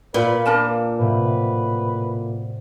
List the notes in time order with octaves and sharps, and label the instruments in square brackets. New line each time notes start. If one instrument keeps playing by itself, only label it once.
[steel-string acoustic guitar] A#2 [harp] F4 [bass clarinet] B4
[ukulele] D4 A#4 A5
[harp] A2 C3 F#3 [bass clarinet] B4